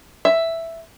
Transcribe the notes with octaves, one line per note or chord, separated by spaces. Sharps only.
E5